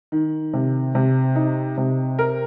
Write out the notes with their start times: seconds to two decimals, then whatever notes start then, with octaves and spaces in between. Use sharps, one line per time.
0.12 D#3
0.53 C3
0.95 C3
1.35 D#4
1.78 C3
2.19 A#4